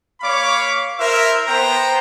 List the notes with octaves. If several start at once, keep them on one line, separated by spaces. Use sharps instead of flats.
A#3 C#5 F5 B5 C#6 D6
E4 A#4 C5 E5
B3 C5 G5 A#5